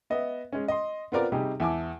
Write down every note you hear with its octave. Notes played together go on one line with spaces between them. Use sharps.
B3 D#5 E5
G#3 C#4
D#5 C6
B3 C4 F4 A#4 D5 A#5
C3 G3 D#4 G4 G#4
E2 E4 G#5 A5 D6